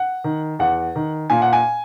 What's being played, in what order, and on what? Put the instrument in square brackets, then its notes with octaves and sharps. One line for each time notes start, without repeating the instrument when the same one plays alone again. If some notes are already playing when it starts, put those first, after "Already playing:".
Already playing: [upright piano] F#5
D#3
E2 F#5
D#3
A#2 G#5
F#5
G#5